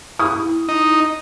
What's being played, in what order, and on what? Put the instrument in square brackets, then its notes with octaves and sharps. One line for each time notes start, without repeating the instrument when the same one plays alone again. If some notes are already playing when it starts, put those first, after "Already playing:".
[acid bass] E4 [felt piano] D#6
[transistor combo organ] D#4